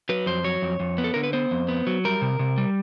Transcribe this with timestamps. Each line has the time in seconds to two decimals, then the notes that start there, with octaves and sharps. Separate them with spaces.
0.09 F#3 B4
0.26 F2 C5
0.44 F#3 C#5
0.62 F2
0.80 F2
0.98 B3
1.04 A4
1.14 D3 A#4
1.23 B4
1.33 B3 C5
1.51 F2
1.68 B3
1.87 F#3
2.05 G3 A#4
2.22 C3
2.39 C3
2.58 G3